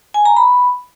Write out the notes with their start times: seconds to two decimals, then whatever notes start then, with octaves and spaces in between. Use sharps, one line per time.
0.14 G#5
0.25 A#5
0.37 B5